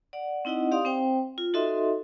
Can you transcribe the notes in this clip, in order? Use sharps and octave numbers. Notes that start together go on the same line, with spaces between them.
D5 F#5
C4 D#4 E4 D#5 F#5
G4 D5 F5 C6 D#6
C4 C5 G5
F4
D#4 F#4 A4 D#5 E5 C6